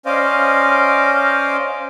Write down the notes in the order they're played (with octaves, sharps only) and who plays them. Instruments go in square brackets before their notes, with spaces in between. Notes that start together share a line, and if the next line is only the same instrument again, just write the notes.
[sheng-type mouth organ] C#4 C5 D5 D#5 F5